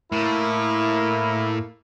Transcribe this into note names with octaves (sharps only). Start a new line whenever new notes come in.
A2 A#3 E4 A#4